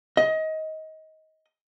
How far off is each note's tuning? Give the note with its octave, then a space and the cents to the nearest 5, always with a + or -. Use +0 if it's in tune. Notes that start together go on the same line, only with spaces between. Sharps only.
D#5 +20